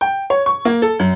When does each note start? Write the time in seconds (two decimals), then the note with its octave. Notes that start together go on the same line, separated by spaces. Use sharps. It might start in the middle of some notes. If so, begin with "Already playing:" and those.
0.01 G5
0.30 C#5
0.46 C#6
0.65 A#3
0.82 A4
0.99 F#2